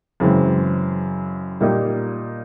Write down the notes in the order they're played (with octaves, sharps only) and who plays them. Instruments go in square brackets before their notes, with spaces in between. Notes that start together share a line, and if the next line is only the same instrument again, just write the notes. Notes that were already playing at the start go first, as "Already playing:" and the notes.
[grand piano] F#2 C#3 E3 G#3 C4
A#2 G3 A#3 D#4 G4